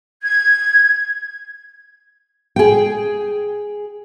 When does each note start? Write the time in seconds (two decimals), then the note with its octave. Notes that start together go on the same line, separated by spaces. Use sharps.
0.23 G#6
2.56 G#4 G5